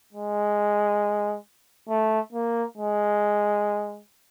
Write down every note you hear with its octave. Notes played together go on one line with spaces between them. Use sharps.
G#3
A3
A#3
G#3